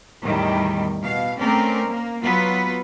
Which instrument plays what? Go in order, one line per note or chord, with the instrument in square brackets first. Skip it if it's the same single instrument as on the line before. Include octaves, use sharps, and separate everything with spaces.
[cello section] E2 A2 D#3 G3
B2 F5
A3 C4 C#4 A#4 D5
A#3
F#3 B3 F4 B4